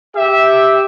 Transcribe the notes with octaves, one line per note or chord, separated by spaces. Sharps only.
G4 E5